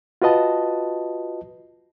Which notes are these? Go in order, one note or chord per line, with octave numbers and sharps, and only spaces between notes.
F4 F#4 B4 D#5 A5